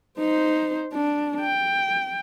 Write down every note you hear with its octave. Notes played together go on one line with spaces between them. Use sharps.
D#4 C5
D4
G5